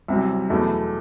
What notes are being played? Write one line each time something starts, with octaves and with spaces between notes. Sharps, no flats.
C2 C3 F#3
E2 B2 F#3 A3 E4